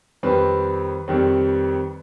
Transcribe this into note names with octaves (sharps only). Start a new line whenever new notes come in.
F2 D#3 G3 C4 B4
F2 D#3 G3 C4